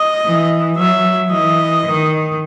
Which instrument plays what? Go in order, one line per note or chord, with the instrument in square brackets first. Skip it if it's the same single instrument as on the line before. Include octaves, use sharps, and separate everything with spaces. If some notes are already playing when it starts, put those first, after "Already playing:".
Already playing: [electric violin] D#5
[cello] E3
[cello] F#3 [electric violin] E5
[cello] E3 [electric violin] D#5
[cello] D#3